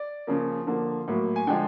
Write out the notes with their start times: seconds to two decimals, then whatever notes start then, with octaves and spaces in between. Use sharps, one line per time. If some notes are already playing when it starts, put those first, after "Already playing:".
Already playing: D5
0.27 C#3 F3 A#3
0.67 D3 F3 A#3
1.08 A2 F#3 A#3
1.36 G#5
1.47 D3 F3 G#3 G5